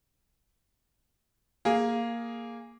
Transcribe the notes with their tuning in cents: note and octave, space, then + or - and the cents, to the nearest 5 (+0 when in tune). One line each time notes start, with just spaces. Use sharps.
A#3 +0 G#4 +0